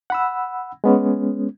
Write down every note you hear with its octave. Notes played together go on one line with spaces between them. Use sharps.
F#5 B5 E6
G#3 B3 C#4